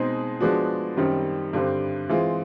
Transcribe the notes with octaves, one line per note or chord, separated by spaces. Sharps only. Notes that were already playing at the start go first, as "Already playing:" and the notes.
Already playing: B2 G#3 C4 D#4 G#4
F3 G#3 B3 D4 F#4
F#2 D#3 G3 C4
G2 D3 G3 C4
E3 G#3 C4 F4